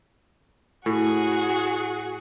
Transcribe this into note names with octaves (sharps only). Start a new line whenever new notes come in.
A2 F#4 G#4